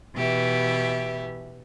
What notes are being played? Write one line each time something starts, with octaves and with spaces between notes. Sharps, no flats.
B2 E3 G4 E5